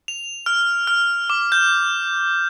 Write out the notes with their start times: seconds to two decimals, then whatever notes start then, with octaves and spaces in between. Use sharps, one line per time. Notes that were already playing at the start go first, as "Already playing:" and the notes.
0.08 F7
0.46 F6
0.87 F6
1.30 D6
1.52 G6